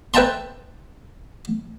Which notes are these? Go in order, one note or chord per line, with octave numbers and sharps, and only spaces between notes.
B4 E5 G5 A5 A#5 C6